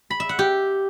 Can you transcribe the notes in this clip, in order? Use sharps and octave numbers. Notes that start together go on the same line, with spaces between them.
B5
E5
F#5
G4